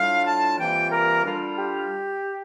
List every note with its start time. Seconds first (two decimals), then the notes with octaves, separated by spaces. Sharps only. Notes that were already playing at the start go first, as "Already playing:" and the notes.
Already playing: A2 G3 D4 F4 F5
0.26 A5
0.58 C3 E3 G3 A#3 F4 G5
0.90 A#4
1.23 D3 G3 D4 F4
1.56 G4